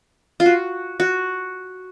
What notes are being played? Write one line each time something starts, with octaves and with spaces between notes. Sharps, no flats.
F4
F#4
F#4